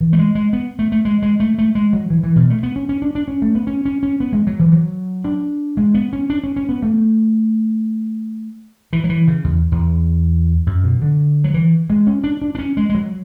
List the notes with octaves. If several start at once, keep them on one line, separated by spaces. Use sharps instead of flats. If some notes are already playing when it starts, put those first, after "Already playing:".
E3
A3
G#3
G#3
B3
A3
A3
G#3
G#3
A3
A3
G#3
F#3
E3
E3
B2
A3
B3
C#4
C#4
D4
D4
C#4
A3
B3
C#4
C#4
C#4
B3
G#3
F#3
E3
F#3
D4
G#3
B3
C#4
D4
C#4
C#4
B3
A3
E3
F#3
E3
C#3
E2
E2
F#2
B2
D3
F#3
E3
G#3
C#4
D4
D4
D4
C#4
G#3
G#3
F#3